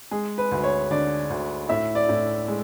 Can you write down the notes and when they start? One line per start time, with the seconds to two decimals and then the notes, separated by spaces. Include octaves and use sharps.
0.11 G#3 G#4
0.38 B4
0.51 D2
0.64 C#5
0.91 D3 D5
1.30 D2
1.69 A2 E5
1.95 D5
2.09 A2
2.48 G#3